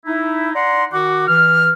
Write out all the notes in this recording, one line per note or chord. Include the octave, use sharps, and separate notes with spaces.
D#4 E4
D5 F#5 A#5 C6
D#3 F#4 F#5 D6
E3 F6